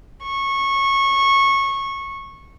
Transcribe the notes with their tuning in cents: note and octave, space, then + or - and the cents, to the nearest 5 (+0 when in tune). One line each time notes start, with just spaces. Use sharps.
C#6 -20